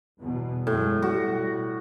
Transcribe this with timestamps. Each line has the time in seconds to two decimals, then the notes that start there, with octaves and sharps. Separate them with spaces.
0.21 G1 E2 B2
0.67 F#2 A2 G#3
1.02 B2 G3 F#4